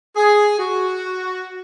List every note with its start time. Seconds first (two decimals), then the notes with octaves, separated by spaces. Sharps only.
0.16 G#4
0.58 F#4